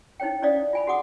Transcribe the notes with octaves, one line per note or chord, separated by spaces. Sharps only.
D#4 E4 C5 C#5 G5
C#4 E4 C5 D5 F5 D#6
F4 G#5 B5
F#4 G#4 F#5 D6 D#6